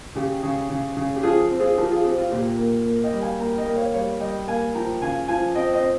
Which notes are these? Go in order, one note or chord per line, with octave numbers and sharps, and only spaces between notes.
C#3 G4
C#3
C#3
C#3
G4
F3 F4 G#4
C4
F4 G#4
F3 G4 A#4
F4 G#4
C4 G4
F4
A#2 G4
A#3
A#3
D#5 G5
G3
F5 G#5
A#3 G5 A#5
D#5 G5
A#3
C#5 F5
G3 C#5 F5
G3 D#5 G5
A#3 F5 G#5
F3 G5 A#5
C#3 F5 G#5
F3 F5 G#5
C4 D#5 G5
C5 D#5
C4